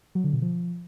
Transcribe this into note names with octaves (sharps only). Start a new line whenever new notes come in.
F#3
D3
B2
F3